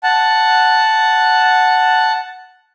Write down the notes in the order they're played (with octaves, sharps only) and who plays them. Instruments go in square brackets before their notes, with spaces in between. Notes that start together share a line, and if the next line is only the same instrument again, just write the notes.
[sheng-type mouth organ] F#5 A5